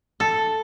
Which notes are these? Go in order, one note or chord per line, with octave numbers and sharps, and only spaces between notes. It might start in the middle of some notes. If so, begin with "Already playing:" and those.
A4